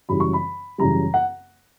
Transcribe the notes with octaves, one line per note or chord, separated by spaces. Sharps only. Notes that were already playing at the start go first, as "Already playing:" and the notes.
F#2 C#3 E3 G3 B5
C#6
B5
F#2 C#3 E3 G3 A#5
F#5